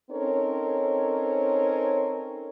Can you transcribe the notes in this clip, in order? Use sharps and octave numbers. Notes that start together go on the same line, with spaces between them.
C4 C#4 D#4 A4 A#4 C#5